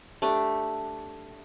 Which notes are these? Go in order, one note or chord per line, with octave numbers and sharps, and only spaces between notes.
A3 D4 G4